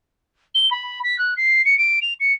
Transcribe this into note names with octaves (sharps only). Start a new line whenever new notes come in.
G7
B5
B6
F#6
C7
C#7
D7
F7
C#7